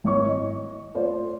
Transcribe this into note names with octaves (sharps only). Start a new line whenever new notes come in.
G#1 E4 C#5 C#6
D#5
A3 F4 C5 D5